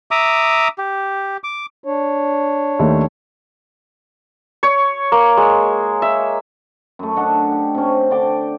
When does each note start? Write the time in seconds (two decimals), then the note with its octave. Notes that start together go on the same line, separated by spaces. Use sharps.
0.11 E5 A#5 D6 D#6
0.78 G4
1.44 D6
1.84 D4 C#5
2.79 D#2 D#3 A3
4.63 C#5
5.12 A#3
5.37 G#3
6.02 E5
6.99 F#2 A3
7.16 D4 A4 D#5 F#5
7.51 G4
7.75 C3 C#4
8.11 D3 D5 G5 D6